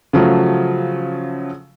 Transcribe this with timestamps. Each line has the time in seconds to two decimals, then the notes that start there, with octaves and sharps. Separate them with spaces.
0.13 C#3 F3 F#3 A3